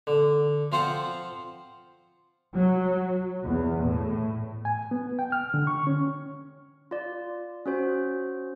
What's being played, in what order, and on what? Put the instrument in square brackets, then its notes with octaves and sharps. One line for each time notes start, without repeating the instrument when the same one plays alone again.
[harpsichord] D3
F3 C4 F4 C5 F#5
[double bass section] F#3
E2
A2
[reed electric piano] G#5
B3
G5
F6
D3
C#6
C#4
[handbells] F4 D5
C#4 F#4 C5